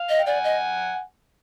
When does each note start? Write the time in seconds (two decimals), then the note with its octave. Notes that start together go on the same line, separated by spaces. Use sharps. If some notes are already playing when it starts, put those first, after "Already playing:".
Already playing: F5
0.09 D#5
0.19 G5
0.26 D5 F#5 G#5
0.44 D#5